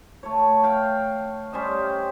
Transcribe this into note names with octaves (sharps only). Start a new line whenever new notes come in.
A3 C#5
F5 G5
G3 C#4 C5 D#5